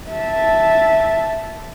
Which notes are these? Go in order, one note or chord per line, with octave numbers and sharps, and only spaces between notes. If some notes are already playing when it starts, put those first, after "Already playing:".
E5 A5